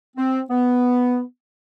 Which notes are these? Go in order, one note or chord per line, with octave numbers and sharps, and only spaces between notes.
C4
B3